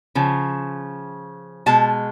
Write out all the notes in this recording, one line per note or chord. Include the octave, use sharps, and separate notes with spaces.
C#3 F3
B2 G#3 A5